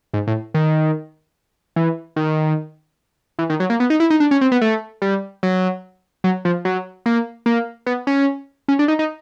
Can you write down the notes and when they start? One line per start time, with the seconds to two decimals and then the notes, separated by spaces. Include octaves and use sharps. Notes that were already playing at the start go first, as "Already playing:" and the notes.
0.14 G#2
0.27 A2
0.54 D#3
1.76 E3
2.16 D#3
3.39 E3
3.50 D#3
3.60 F#3
3.70 A#3
3.80 B3
3.90 D#4
4.00 E4
4.10 D#4
4.20 D4
4.31 C#4
4.41 C4
4.52 B3
4.61 A3
5.02 G3
5.43 F#3
6.24 F#3
6.45 F3
6.65 F#3
7.06 A#3
7.46 A#3
7.86 B3
8.07 C#4
8.68 C#4
8.79 D4
8.88 D#4
8.99 D#4